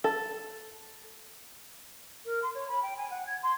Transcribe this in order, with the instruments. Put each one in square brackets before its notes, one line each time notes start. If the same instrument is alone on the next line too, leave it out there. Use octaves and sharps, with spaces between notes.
[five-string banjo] A4
[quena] A#4
C6
C#5
B5
G5
G#5
F#5
G#6
C6